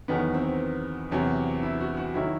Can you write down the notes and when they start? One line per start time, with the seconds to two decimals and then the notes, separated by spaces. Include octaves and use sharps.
0.08 E2 D#3 F#3 B3
0.34 C4
1.11 E2 C3 F#3
1.63 E4
1.81 F#4
1.97 F#4
2.14 D#3 F#3 E4